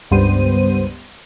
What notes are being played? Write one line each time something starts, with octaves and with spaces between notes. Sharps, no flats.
C#2 G2 G3 B3 C5 D#7